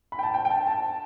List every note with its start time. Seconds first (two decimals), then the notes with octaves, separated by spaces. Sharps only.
0.12 B5
0.19 G5
0.23 A5
0.34 G5
0.45 G5
0.50 A5
0.67 A5